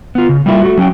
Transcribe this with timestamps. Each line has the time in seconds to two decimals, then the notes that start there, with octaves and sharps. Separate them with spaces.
0.15 B3 F4
0.29 C#3
0.46 G3 A3 A#3 E4 F4 E5
0.61 A3 F#4
0.77 F#3 C#4 F#4 G5